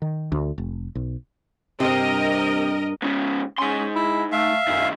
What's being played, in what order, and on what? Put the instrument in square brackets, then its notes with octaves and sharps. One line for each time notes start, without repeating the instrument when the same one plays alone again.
[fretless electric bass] D#3
D2
F1
B1
[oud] G2 C4 [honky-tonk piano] C3 [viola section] A#4 D#5
[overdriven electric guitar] G#2 C#3
[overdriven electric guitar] G#2 C6 [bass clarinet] C#4
[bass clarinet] E4
[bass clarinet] A3 [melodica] E5 F5
[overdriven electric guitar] C2 D#3 [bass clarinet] F#2